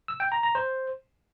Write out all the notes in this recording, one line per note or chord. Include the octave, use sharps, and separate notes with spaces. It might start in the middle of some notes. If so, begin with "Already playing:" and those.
E6
G5
A#5
A#5
C5